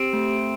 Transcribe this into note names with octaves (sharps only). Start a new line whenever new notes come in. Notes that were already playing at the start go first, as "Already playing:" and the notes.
Already playing: C4 G4
A3